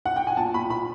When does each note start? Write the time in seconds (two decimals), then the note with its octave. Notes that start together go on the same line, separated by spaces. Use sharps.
0.05 F#5
0.16 G5
0.27 G#5
0.37 A#2 A5
0.54 A#2 B5
0.70 A#2 B5